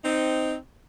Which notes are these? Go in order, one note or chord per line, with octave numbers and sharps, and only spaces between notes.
C4 D#4